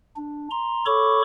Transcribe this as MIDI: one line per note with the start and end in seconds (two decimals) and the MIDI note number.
0.16 0.48 62
0.51 0.86 82
0.51 0.86 84
0.86 1.22 69
0.86 1.22 73
0.86 1.22 83
0.86 1.22 85
0.86 1.22 86